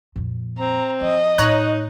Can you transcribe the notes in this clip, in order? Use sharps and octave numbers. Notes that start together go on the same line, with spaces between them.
F2 A#2
C4 A#5
F3 D#5
A2 D#4 C#5 A#5 F#6